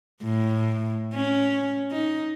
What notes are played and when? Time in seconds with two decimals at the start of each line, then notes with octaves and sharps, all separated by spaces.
0.23 A2
1.15 C#4
1.92 D#4